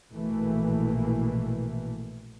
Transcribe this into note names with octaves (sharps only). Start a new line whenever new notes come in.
A#1 B2 E3 A3 A#3